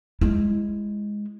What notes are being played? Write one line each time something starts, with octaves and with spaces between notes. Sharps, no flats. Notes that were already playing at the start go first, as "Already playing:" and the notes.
G#3 E4